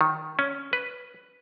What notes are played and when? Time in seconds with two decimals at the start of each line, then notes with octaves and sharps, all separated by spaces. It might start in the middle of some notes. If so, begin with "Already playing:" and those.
0.01 D#3
0.39 C#4
0.73 B4